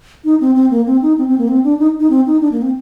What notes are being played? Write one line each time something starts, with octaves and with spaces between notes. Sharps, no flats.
D#4
C4
C4
A#3
C4
D#4
C4
C4
A#3
C4
D4
D#4
D#4
C4
D#4
D4
A#3
C4